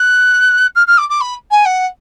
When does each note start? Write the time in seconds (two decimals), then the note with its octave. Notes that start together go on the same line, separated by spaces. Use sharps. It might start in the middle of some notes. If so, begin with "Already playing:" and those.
Already playing: F#6
0.75 F6
0.87 F6
0.98 D6
1.10 D6
1.21 B5
1.51 G#5
1.65 F#5